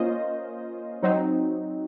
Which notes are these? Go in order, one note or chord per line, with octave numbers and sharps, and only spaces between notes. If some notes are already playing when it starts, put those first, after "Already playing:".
Already playing: A#3 C#4 F4 C5 D#5
F#3 C4 D#4